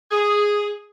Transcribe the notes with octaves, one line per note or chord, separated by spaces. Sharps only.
G#4